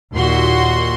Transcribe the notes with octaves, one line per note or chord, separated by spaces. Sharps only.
D#2 A#2 F#4 C6